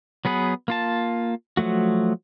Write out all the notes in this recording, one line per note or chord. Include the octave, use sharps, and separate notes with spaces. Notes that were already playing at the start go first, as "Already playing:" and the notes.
F#3 B3 G#4 B4
A#3 F4 A5
F3 F#3 A3 F#4